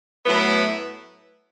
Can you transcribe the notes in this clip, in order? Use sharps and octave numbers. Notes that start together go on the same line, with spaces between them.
A2 F#3 B3 E4 B4